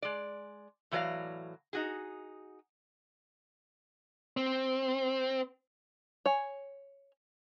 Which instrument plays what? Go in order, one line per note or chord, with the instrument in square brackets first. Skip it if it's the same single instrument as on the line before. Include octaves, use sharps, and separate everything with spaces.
[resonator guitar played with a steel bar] G#3 D5
A2 E3 F#3 A4 D5 F5
D#4 F#4 G#4
[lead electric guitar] C4
[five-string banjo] C#5 G#5